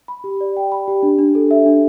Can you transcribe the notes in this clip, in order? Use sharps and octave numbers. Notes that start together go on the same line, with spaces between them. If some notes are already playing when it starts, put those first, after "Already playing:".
B5
G4
D5
G5
B5
G4
D4
D4
A4
E5
D4